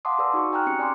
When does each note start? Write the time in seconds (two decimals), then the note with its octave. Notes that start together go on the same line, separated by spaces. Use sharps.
0.05 F5 F#5 A5 C6 D6 D#6
0.19 G#4 B4 D5 D#6 E6
0.34 D#4 F#4 C#6
0.53 G5 G#5 A#5 D#6 F6 F#6
0.67 C4 C#4 G4 G#4 D#6 C#7
0.79 D5 G#5 C6 D6